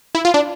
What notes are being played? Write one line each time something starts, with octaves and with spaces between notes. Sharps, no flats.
E4
F4
D4